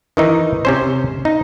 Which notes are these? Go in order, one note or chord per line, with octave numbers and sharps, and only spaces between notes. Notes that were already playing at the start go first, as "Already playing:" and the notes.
D#3 E3 D#4
C3 C#4 C5
D#4